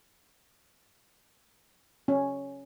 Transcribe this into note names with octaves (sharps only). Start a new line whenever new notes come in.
C#4